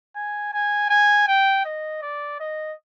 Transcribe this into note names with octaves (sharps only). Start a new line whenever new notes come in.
G#5
G#5
G#5
G5
D#5
D5
D#5